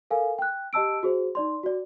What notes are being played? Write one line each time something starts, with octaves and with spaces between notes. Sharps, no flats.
A4 A#4 F5 G#5
G5 F#6
G4 D#5 A5 E6 D7
F#4 G#4 C5
D#4 D5 C6
F#4 D5